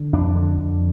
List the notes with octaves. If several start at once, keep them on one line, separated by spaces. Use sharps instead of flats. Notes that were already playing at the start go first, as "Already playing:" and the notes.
Already playing: D3
F2 D4
D3
F2